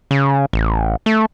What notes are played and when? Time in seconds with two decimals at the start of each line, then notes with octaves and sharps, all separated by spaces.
0.11 C#3
0.53 A1
1.06 A3